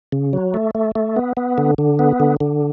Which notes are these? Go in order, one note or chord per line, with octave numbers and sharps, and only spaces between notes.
C#3
F#3
A3
A3
A3
B3
B3
D3
D3
B3
D3
D3